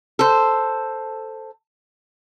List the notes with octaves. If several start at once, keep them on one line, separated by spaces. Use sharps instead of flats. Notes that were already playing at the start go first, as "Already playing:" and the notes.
A4 C5